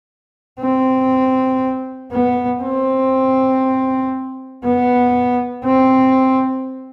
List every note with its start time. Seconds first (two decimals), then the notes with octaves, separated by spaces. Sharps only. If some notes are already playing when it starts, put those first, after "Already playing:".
0.60 C4
2.11 B3
2.63 C4
4.64 B3
5.64 C4